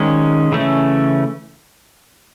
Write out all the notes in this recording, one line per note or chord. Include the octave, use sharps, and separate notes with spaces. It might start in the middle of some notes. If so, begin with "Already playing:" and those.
Already playing: D#3 G#3 C#4
C#3 E3 A3 C#4